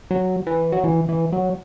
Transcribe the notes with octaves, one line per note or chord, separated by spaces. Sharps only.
F#3
E3
F#3
E3
E3
F#3